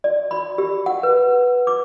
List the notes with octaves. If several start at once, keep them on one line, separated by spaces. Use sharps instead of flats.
D5
B5
G4
F#5
B4
D6